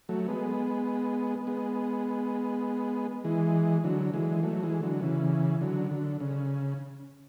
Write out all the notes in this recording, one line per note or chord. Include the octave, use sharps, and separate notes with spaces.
F#3 A3
G#3 B3
G#3 B3
E3 G#3
D3 F#3
E3 G#3
F#3 A3
F#3
E3 G#3
D3 F#3
C#3 E3
D3 F#3
D3
C#3